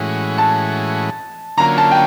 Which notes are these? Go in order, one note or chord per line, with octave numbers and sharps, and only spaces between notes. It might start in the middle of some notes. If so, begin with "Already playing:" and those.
Already playing: A2 E3 G#3 C#4 F#4
A5
D3 F#3 A#3 C#4 F4 A#5
A5
G5